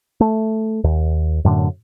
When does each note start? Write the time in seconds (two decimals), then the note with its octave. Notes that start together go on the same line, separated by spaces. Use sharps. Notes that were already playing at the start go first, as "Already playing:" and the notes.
0.20 A3
0.84 D#2
1.45 F#2 A2 D3